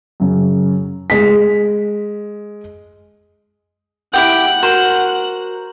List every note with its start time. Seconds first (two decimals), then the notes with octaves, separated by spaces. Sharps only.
0.20 F#2 C#3
1.10 G#3 B6
4.14 E4 G4 F#5 G5 F#6
4.63 F#4 A#4 C5 A#5